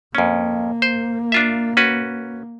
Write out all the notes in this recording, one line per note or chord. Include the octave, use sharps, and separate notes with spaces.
F2 A#3 C#4
C5
D4 F4 E5
C#4 F#4 B4